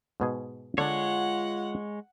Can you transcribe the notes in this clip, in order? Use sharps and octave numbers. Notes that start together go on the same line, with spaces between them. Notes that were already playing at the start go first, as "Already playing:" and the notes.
G#2 B2 G#4
D3 G#3 D4 F4 C#5 F#5